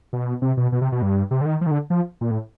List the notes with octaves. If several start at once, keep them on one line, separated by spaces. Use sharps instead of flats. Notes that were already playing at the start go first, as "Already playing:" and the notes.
B2
C3
B2
B2
C3
B2
G2
C3
D3
D#3
F3
D#3
D3
F3
A#2
A2